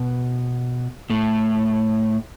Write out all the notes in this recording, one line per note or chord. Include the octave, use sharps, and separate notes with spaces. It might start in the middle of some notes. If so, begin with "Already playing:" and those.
Already playing: B2 B3
A2 A3